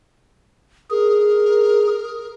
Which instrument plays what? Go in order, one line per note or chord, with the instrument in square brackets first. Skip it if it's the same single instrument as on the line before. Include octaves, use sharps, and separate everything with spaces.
[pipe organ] G#4 [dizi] A#4